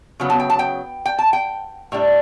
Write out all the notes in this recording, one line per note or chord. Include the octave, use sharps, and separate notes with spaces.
C#3 F#3 B3
A5
G5
A5
G5
G5
A5
G5
A2 G3 D4